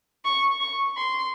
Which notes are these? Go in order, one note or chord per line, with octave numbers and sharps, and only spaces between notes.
C#6
C#6
C6